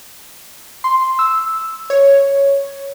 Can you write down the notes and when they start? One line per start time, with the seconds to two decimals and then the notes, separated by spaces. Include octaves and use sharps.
0.84 C6
1.19 E6
1.90 C#5